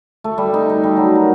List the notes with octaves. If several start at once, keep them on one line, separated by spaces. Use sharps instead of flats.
A3
G3
D#4
D#4
G3
F#3
A#4